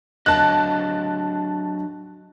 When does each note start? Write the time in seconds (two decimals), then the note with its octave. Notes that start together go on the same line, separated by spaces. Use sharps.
0.26 F#3 D4 D#5 A5 F#6